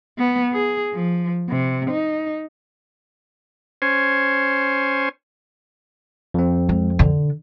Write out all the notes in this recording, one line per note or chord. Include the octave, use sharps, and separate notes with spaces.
B3
G#4
F3
C3
D#4
C#4 C5 G#5
F2 C4
G#3
D3